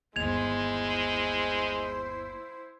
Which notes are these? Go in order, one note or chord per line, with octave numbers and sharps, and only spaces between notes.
G1 D#2 G#3 E4 C5 G#6 F7